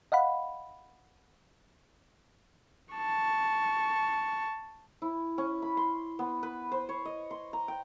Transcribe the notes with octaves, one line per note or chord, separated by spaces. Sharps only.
D#5 F5 F#5 B5
A5 C#6
E4
C#4
B5
C6
B3
B4
C5
C#5
D#5
C6
A#5
G5